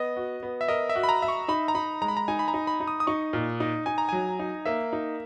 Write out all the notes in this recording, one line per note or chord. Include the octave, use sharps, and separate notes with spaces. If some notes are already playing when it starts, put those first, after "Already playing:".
Already playing: B3 D#5
F#4
B3
E5
A#4 D#5
E5
F#4
B5
A#5
E5
C#6
D#4 B5
A#5
D#4 B5
G#3 A#5
B5
A#5
D#4 G#5
B5
A#5
D#4
B5
D#4
D#6
D#6
D#4 C#6
A#2
D#4
D#4 G#5
A#5
F#3 G#5
D#4
A#3 E5
D#4